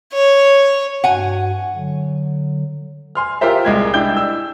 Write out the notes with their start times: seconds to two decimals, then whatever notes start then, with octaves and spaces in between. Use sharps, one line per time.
0.13 C#5
1.04 G2 F#4 F#5 G#5
1.75 D3 F#3
3.15 G#5 C6 F6
3.41 F4 G4 A#4 C5 E5
3.65 C2 G#3 G#6
3.94 D4 E4 G5 G6 G7
4.17 E6